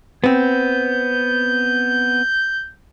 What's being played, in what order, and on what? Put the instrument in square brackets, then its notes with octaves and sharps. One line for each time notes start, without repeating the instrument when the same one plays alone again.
[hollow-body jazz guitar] B3 C4 [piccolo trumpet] G6